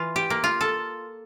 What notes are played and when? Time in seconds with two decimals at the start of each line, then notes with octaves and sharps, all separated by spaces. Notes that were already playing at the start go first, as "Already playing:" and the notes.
Already playing: E3 F4
0.16 G4
0.30 A#3
0.44 F4
0.61 A4